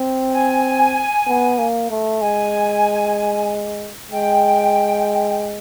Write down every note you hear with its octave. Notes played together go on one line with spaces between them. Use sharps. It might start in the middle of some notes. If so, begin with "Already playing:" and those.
Already playing: C4
G#5
B3
A#3
A3
G#3 G#5
G#3 G5